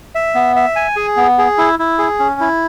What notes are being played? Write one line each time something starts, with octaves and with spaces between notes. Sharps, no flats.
E5
B3
E5
G#5
G#4
B3
G#4
E4
E4
G#4
C#4
E4